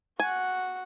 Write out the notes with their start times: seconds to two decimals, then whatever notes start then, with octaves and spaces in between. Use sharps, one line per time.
0.20 F#4 F#5 G#5